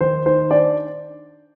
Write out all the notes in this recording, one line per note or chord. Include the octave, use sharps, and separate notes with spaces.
D#3 C5
D#4 C5
D4 D5